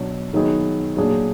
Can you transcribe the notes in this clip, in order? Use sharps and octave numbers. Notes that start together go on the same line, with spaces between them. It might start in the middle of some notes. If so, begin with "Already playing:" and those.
Already playing: B2 F#3 D4
D#3 F#3 B3 D#4 G#4
A#2 F#3 D4 G#4